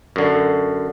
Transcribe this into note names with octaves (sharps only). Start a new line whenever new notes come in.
F#2 D3